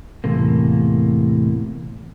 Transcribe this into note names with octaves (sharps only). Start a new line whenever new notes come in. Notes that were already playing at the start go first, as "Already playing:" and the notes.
E2 A2 C3 A#3